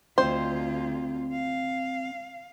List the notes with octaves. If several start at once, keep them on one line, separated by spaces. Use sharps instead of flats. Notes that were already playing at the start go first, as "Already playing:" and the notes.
D2 C4 F4 C5 D#5
F5